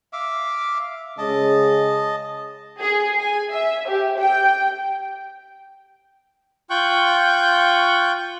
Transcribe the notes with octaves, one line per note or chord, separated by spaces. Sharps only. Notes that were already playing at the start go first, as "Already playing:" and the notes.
E5 F5 D6
C#3 G#3 D#5 A5
G#4
G#5
E5
G4
G5
F4 G5 C#6 F#6 G6